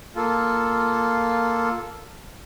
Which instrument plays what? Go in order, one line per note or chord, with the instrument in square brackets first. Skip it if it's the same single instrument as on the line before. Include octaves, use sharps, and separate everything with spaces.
[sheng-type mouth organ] A#3 F4 A4